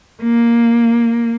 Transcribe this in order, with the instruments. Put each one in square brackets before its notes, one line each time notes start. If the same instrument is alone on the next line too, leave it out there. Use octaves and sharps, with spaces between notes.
[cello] A#3